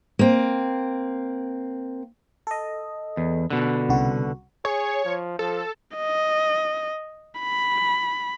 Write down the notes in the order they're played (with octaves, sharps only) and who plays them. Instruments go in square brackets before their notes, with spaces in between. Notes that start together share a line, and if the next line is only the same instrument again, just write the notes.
[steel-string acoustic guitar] A#3 C4
[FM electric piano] A4 D#5
[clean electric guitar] E2
B2 D3
[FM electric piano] C2 C#3 F#4
[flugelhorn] G#4 [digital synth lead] C#5
[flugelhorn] F3
[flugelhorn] F3 [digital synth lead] A4
[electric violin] D#5
B5